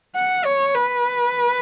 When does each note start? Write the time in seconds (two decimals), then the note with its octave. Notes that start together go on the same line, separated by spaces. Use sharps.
0.16 F#5
0.45 C#5
0.75 B4